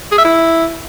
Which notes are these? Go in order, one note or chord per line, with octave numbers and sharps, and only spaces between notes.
G#4
E5
E4